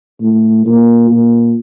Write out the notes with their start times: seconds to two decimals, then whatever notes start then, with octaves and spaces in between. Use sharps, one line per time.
0.21 A2
0.66 A#2
1.10 A#2